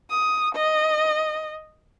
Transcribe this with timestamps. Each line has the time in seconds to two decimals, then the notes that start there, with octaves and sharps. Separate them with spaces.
0.11 D#6
0.55 D#5